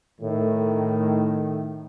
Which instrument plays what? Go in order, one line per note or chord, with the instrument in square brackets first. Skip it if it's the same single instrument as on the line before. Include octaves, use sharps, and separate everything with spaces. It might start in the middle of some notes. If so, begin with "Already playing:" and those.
[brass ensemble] A2 D#3